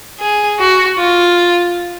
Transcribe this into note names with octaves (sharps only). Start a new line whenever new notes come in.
G#4
F#4
F4